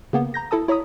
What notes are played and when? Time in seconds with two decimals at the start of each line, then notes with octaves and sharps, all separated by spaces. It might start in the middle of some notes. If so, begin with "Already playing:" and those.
0.13 C#3 A#3 B3
0.34 A#5 G6 A#6
0.51 E4 A4 A5 D#6
0.68 E4 C#5 A#5 B5 D#6